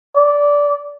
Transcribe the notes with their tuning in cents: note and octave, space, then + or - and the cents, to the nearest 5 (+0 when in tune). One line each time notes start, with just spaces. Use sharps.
D5 -15